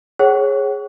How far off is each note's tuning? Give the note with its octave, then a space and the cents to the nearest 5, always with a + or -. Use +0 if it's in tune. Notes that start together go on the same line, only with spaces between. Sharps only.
G#4 +0 C#5 -25 F#5 +40